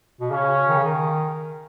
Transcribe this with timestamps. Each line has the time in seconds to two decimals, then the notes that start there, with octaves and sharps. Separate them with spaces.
0.20 B2
0.31 C#3 C#4
0.69 D#3
0.77 C#3
0.84 D#3